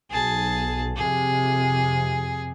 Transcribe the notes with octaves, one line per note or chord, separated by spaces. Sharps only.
B1 G#4 A5
F2 C3 G#4